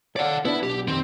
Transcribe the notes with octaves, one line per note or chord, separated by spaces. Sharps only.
C#5 D5 F5 F#5
B3 D4 E4 B4
B1 G4
F2 D#3 C4